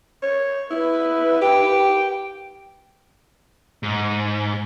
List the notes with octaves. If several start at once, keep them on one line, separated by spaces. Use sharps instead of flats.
C#5
E4 B4
G4 G5
G#2